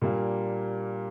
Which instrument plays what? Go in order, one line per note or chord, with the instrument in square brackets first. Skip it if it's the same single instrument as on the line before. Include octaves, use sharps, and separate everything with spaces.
[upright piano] A#2 G3 A#3 D4